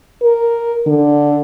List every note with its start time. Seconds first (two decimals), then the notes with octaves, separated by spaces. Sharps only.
0.22 A#4
0.87 D3